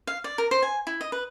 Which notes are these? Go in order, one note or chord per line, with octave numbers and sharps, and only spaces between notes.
F5
D5
A#4
C5
G#5
E4
D#5
B4